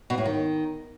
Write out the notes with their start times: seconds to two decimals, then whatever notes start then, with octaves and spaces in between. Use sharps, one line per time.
0.10 B2
0.18 A2
0.25 D#3